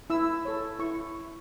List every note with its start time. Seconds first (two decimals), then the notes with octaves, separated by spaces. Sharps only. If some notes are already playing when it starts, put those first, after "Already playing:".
0.10 E4 E6
0.45 A4 C#5
0.79 E4 C#6